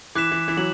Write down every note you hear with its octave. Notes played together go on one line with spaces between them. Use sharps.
E3 D6 F#6 B6 E7
E3
E3
F#3 F#7